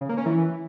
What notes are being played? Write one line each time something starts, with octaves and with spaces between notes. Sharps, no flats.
C#3
A#3
C#4
E3